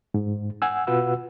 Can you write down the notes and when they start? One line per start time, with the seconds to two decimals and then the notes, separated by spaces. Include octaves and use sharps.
0.14 G#2
0.62 F#5 G#5 E6
0.87 B2 F4 F#4 B4 F#5 E6